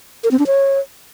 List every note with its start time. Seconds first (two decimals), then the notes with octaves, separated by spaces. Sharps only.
0.24 A#4
0.31 C4
0.39 D4
0.47 C#5